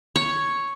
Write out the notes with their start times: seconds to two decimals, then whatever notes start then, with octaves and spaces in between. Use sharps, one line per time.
0.16 C#5